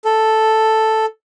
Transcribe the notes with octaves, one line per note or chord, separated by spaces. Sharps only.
A4